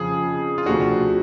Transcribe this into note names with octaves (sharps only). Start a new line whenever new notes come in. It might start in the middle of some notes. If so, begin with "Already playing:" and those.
Already playing: F2 C#3 F3 G#4
F4
D2 C3 F3 A3 D4 F#4